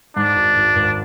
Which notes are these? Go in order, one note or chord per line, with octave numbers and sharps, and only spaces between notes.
G#2 D4
G#1
G#1
G#1